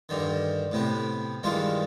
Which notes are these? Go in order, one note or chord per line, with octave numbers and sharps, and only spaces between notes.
G2 D3 D#3
A2 C3 B3
G2 D#3 E3 G#3 F4